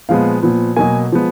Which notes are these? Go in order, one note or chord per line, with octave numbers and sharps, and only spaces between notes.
A#2 F3 G#3 B3 F5
A#2 F3 B3
B2 F#3 A#3 G#5
F3 G#3 B3